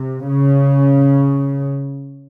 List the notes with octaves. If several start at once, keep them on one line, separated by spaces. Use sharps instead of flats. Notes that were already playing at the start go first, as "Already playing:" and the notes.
Already playing: C3
C#3